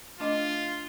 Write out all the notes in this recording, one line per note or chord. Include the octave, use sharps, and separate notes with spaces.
A3 D4 F4 D#5